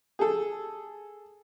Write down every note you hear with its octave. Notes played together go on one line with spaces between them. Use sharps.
G#4 A4